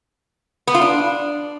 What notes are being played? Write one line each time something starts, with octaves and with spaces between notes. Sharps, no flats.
B3
F4
D4